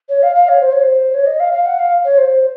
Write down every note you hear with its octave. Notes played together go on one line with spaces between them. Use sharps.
C#5
F5
F5
C#5
C5
C#5
C5
C#5
D#5
F5
F5
F#5
F5
C#5
C5